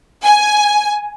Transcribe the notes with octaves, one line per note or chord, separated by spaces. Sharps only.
G#5